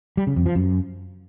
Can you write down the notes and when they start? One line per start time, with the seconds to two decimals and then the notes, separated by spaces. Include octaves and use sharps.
0.17 G3
0.27 C#3
0.36 F2
0.46 F3
0.55 F#2